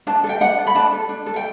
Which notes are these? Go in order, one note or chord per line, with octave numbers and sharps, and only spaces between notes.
D4 A5
A4
G5
D4 F#5
A4
B5
D4 A5
A4
D4
A4
G5